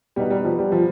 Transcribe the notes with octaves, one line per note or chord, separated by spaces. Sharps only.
B2 G3 B3 D#4 B4
G3
F3
G3
F3